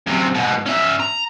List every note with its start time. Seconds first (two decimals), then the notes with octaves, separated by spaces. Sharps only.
0.07 F#2 C3
0.35 G#2 B2
0.66 C#4 E5
1.00 A#5